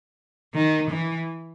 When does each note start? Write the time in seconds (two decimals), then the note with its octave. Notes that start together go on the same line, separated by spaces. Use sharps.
0.54 D#3
0.90 E3